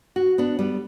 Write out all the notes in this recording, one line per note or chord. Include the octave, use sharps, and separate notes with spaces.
F#4
B3 D4
G3 B3